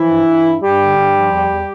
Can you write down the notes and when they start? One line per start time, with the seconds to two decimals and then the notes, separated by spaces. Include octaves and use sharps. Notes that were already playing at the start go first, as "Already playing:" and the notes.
Already playing: E3 F3 E4
0.10 G2
0.27 G2
0.45 G2
0.62 G2 G3 G4
0.79 D3
0.97 G2
1.14 F3
1.31 E2
1.49 E2